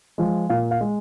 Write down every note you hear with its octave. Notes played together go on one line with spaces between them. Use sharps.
F3 G#3
A#2 F5
F5
G#3